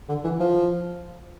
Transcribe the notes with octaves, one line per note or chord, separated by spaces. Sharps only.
D3
E3
F3